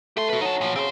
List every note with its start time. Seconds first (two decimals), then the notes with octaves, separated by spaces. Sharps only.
0.17 A3 G4 C6
0.29 F#4 B4
0.41 F#3 D#4 A5
0.61 A#2 F3
0.76 C#3 C4 C5